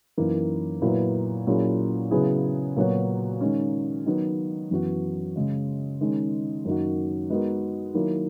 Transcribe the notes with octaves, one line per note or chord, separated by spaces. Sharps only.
F#2 E3 A#3 D#4
A#2 F#3 B3 E4 B4
A#2 F#3 C#4 E4 G#4
C#3 F#3 B3 E4 G#4
A#2 F#3 B3 F#4 C#5
D#3 G#3 C#4
D#3 F#3 B3
F#2 E3 B3 F#4
C#3 G#3 C#4
D#3 G#3 C#4
F#2 D#3 A#3 D#4 F#4
G#3 B3 D#4 F#4 A#4
D#3 F#3 A#3 E4